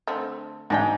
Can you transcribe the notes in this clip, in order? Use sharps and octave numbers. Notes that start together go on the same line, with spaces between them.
D3 A3 C4
G#2 F#3 D4 G5